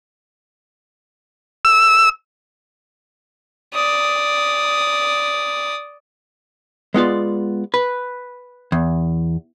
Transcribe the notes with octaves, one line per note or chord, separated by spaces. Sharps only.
E6
D5 D#6
G#3 B3 F4 D5
B4
E2